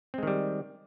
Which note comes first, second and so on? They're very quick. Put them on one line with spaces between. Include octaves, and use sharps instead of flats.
C4 G#3 D#3 G3